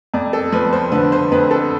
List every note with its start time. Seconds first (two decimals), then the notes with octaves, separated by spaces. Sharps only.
0.14 F2 D5
0.33 A4
0.52 F3 B4
0.73 C5
0.92 D3 B4
1.12 C5
1.32 F2 B4
1.51 A4